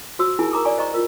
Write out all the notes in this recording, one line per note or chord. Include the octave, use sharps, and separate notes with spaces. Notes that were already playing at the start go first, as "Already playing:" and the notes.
F#4 C5 E6
D#4 E4 G#4 A#4 G#5
A#4 A#5 D6 D#6
D5 G#5 C#6
C5 D#5 A#5 C#6
F4 A#4